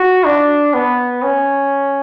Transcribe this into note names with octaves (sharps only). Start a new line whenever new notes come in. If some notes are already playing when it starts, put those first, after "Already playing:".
Already playing: F#4
D4
B3
C#4